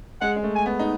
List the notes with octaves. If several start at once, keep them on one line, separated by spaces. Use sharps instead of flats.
G#3 F#5
G#3
A3
G#5
B3
D#4